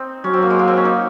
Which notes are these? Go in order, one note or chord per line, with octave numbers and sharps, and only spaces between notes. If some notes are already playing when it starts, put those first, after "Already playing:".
Already playing: C4 D#4
F#3 C#4
C4
A#3
G#3
A#3
C4
C#4
D#4